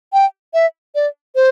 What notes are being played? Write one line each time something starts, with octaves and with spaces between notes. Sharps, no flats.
G5
E5
D5
C5